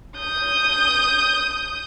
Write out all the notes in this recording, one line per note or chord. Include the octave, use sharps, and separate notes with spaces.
D#6 G6